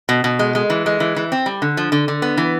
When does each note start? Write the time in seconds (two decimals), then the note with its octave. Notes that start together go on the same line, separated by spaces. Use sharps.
0.09 B2
0.24 B2
0.39 G#3
0.55 G#3
0.70 E3
0.86 G#3
1.00 E3
1.16 E3
1.32 C4
1.46 G3
1.62 D3
1.77 F3
1.92 D3
2.08 D3
2.22 B3
2.37 E3